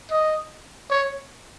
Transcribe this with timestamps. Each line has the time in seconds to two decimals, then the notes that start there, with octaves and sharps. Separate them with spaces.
0.11 D#5
0.91 C#5